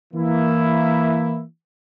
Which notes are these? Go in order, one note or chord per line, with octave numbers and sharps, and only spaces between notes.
E3 A#3 E4